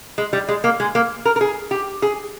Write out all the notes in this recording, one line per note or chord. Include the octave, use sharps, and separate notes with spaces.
G#3
G3
G#3
A#3
G#3
A#3
A#4
A#4
G#4
G4
G#4